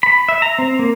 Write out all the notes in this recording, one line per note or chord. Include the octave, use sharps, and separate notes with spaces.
B5
E5
A#5
C4
A#3